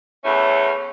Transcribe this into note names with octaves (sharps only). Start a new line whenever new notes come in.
E2 A3 C#4